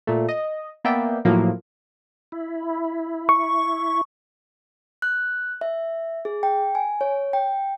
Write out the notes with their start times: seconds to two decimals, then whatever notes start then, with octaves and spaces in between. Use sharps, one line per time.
0.07 A#2 A3
0.29 D#5
0.84 A#3 B3 D5 E5 G5
1.25 A2 F3 F#3 A#3
2.32 E4
3.29 C#6
5.02 F#6
5.61 E5
6.25 G#4
6.43 G5
6.75 G#5
7.01 C#5
7.33 G5